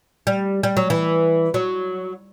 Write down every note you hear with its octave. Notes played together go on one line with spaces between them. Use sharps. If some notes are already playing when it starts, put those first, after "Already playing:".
G3
G3
F#3
E3
F#3